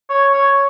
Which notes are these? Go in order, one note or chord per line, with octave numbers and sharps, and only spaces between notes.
C#5
C#5